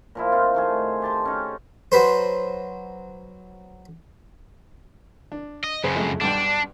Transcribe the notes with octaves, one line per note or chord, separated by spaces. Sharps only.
A#2 F3 E4
C4 D#4 F4
D#3 A3 G#4
G4 A5 C6
C#4 D#4
F#3 B4 C5
D4
D#5
F#2 C#3 G#4 C5
F2 G#3 A3
B1 G2 D4 G5